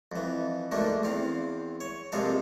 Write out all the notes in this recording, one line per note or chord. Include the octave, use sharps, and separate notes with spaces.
F2 E3
D2 G#2 D3 A3 A#3
E2 C4 F5
C#5
A#1 F2 C3 G#3 A4 F5